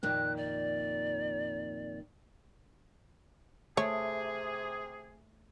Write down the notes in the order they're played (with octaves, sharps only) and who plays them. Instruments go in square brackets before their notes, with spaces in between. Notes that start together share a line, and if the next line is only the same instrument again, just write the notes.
[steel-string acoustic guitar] F2 A#2 D#3 [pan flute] F#6
[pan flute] D5
[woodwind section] C3 G#4 [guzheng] A3 A4 [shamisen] C#5